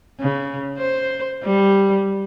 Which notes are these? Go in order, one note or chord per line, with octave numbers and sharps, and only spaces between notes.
C#3
C5
G3